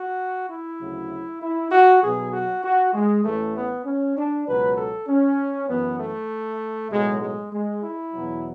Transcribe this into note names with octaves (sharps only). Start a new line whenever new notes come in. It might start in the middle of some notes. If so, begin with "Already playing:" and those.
Already playing: F#4
E4
D2 C#3 F#3
E4
F#4
B1 B2 F#3 G#4
F#4
F#4
G#3
A1 A2 E3 A3
B3
C#4
D4
C#2 B2 F#3 B4
A4
C#4
F#2 E3 B3
A3
B1 A2 F#3 G#3
G#3
G#3
E4
E2 B2 F#3